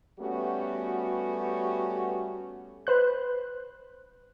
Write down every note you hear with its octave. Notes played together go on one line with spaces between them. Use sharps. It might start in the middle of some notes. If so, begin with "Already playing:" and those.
G3 A3 B3 C#4 F#4 G4
B4 C5 F#6